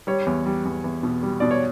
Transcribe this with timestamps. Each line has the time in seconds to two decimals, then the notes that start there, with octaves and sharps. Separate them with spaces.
0.07 G3 C#5
0.26 E2
0.46 G3
0.65 E2
0.84 E2
1.03 B2
1.23 G3
1.40 B2 D5
1.51 C#5